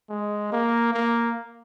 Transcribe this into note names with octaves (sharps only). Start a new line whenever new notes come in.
G#3
A#3
A#3